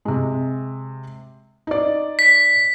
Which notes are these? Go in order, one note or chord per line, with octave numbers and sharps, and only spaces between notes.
C3 G#3
D#4 D5
B6